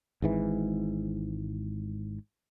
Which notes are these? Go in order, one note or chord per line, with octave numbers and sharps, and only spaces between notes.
G#1 G#2 E3